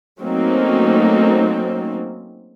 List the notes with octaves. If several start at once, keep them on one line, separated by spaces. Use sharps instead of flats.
F#3 A3 A#3 C4 C#4 D#4